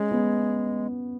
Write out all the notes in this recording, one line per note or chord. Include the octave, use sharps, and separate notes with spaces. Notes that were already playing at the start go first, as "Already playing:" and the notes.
Already playing: G#3 C#4
B3